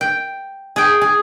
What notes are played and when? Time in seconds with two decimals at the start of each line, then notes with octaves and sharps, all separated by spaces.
0.01 G5
0.76 G#4 G5
1.01 G#4